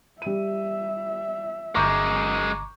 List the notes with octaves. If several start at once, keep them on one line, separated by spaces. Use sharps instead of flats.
G3 E5 D#7
G1 F#2 G#3 A#5 C#6 D6 G6